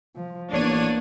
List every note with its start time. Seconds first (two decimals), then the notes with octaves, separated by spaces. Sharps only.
0.16 F3
0.52 A1 A#3 B3 D4 C#5 D#7